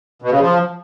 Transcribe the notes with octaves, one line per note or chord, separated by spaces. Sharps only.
B2
C#3
F3